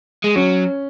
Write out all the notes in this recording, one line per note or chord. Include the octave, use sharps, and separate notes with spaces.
G#3
F#3 C#4